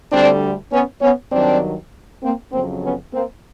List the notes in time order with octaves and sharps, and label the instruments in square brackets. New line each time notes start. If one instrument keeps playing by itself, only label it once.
[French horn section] D2 D3 G3 C4 D4
B3 C#4
B3 C#4
G2 D#3 F#3 C4 D4
A#3 C4
F2 C#3 F#3 A#3 C4
B3 C#4
A#3 C4